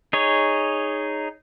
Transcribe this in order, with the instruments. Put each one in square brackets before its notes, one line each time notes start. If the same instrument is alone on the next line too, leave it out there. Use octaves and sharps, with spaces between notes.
[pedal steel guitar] D#4 G#4 C#5